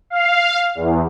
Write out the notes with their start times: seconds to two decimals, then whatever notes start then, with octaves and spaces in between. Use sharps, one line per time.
0.10 F5
0.75 E2